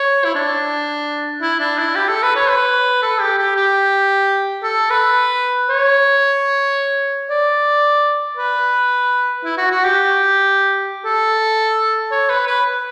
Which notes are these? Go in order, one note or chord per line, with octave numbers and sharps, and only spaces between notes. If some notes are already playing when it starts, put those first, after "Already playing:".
Already playing: C#5
E4
D4
E4
D4
E4
G4
A4
B4
C#5
B4
A4
G4
G4
G4
A4
B4
C#5
D5
B4
E4
F#4
F#4
G4
A4
C#5
B4
B4